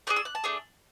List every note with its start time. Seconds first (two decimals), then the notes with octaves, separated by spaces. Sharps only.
0.07 A3 D4 G#4 F#6
0.16 E6
0.25 F#6
0.35 A5
0.44 A3 D4 G#4